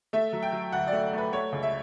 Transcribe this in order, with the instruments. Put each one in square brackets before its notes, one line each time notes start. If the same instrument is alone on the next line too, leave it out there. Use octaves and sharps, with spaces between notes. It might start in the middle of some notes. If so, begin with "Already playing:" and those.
[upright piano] A3 E5
F#3
G5
F#3
D2 F#5
D5
A3
A3 B4
A3 C#5
C#2
E5